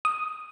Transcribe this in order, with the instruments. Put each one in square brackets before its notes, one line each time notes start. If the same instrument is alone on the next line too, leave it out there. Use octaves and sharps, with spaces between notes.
[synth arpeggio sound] D#6